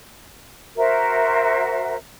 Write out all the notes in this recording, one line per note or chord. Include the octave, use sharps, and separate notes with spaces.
F#4 A#4 C5 E5